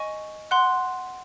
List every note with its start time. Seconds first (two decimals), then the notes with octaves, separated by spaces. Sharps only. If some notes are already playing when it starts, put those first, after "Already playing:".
Already playing: D#5 G#5 C#6
0.51 F#5 C6 F#6